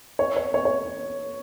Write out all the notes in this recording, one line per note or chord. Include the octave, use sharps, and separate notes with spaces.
C#5
C#5
C#5
C#5